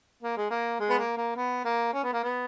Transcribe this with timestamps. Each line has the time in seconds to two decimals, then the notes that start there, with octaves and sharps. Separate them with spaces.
0.23 A#3
0.36 G#3
0.50 A#3
0.79 G#3
0.89 B3
0.99 A#3
1.17 A#3
1.36 B3
1.65 A#3
1.93 C#4
2.03 B3
2.13 A#3
2.23 B3